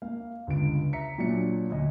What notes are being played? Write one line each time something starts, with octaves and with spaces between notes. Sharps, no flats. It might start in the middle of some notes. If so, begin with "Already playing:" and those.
A#3 F5
G1 C#2 D7
E5 A#5 B6 C#7
A#2 F#3 D4 C#7
D2 D#5